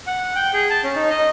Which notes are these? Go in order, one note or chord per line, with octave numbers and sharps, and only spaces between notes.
F#5
G5
G#4
A5
C#4
D#4
D#5